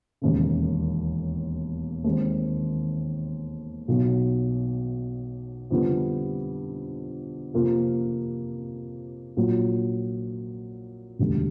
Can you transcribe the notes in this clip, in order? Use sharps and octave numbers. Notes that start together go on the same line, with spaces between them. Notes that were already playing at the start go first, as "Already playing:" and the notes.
E1 D#2 C#3
D#2 D#3 G#3 C4
B1 B2 F#3
F2 D3 G3 B3 D4
F2 C3 F3 A#3
A#1 A#2 F#3
E1 D2 D3 G3